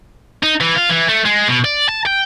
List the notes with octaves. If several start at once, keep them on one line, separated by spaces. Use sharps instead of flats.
D#4
E3
F4
E3
A3
G#3
B2
D5
A5
G5